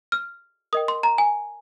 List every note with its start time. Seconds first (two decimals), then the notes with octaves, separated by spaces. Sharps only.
0.12 F6
0.73 A#4 D#5 G5 D#6
0.88 C6
1.03 A#5
1.18 G#5